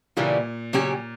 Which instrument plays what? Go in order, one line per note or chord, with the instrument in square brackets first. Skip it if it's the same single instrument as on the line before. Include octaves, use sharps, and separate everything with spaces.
[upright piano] A#2 [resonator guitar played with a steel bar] C#3 E3 G3 A#3 C#4
[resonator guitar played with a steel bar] C#3 F#3 C#4 G4